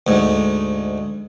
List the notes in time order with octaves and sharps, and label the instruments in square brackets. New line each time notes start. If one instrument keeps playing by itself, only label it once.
[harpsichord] D2 G#2